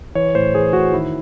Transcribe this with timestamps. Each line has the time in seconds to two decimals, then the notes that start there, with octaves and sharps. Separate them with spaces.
0.15 E3 C#5
0.35 A2 C5
0.55 E3 G#4
0.73 A2 F#4
0.92 D#3 E4